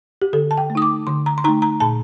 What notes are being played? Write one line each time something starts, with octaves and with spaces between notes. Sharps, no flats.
G4
D3 A4
A5
G5
A3
D#4 D#6
D6
D3 C6
A#5
C6
A3 D#4 A#5
A#5
A#2 A5